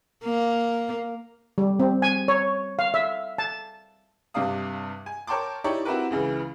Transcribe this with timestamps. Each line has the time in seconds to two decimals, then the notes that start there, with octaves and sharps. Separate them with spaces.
0.25 A#3
1.58 G3
1.79 C4
2.02 G#5
2.28 C#5
2.79 F5
2.94 E5
3.38 A5
4.34 G2 C3 G4 D5 F5 D#6
5.06 G#5
5.27 A#4 C#5 G5 A5 C6 D6
5.64 D#4 E4 G4 C#5 D5
5.85 C4 E4 F#4 G4 A#4 B4
6.11 C#2 C#3 E3